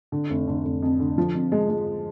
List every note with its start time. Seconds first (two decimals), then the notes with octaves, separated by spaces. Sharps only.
0.12 D3
0.30 F1
0.47 D3
0.65 F1
0.83 F2
1.00 D3
1.18 F3
1.35 F2
1.52 G#3
1.69 G#3